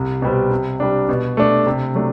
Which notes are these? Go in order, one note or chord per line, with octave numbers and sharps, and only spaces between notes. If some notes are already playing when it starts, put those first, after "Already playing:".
Already playing: C2
B2 G3 C4
C3
G3 D4
B2
A3 D4
C3
F#3 A3 D4